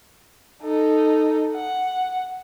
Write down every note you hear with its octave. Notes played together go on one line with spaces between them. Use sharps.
D#4 A4
F#5